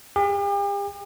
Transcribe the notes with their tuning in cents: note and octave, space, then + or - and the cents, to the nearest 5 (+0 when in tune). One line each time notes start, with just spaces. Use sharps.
G4 +45